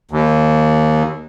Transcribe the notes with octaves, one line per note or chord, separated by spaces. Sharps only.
D#2